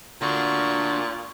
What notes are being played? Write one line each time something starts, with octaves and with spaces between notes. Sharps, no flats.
A#2 D3 F#4 C#6